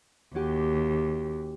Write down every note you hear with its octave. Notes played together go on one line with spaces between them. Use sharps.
D#2 C#4 F#4 G4